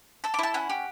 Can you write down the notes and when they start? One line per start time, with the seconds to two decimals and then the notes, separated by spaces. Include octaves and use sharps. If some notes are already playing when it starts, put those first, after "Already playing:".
0.24 A4 E6
0.34 D6
0.39 E4 A5
0.54 C#4 F#5
0.70 G4